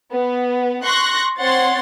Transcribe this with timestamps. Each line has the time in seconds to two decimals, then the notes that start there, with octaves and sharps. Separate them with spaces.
0.11 B3
0.84 C6 C#6 F#6 A#6
1.40 C4 C#5 F#5 C6 A6